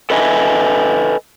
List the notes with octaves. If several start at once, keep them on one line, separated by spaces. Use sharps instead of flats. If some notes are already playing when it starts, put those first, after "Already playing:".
A4 B4 D#5 E5 G#5